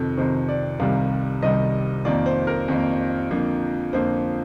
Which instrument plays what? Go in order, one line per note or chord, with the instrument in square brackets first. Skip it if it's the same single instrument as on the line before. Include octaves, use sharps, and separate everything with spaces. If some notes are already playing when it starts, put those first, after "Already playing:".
Already playing: [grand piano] F2 C3 D#3 A4
F2 C3 D#3 C5
D5
C2 C3 D#3 G3 F5
C2 C3 D#3 G3 D#5
F2 D#3 A#3 D5
C5
A#4
F2 D#3 A#3
F2 D3 F3 A#3
F2 D3 F3 A#3 C5